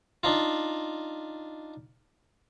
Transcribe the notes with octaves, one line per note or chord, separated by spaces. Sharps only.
D4 D#4 F4